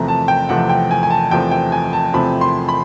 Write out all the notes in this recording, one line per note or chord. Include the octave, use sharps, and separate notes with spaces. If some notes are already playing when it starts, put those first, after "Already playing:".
Already playing: E2 C3 F3 A3 C4 A#5
A5
G5
E2 C3 F3 A3 C4 F#5
G5
G#5
G#5
A5
E2 C3 F3 A3 C4 G5
G5
G#5
A5
E2 C3 F3 A3 C4 B5
C6
B5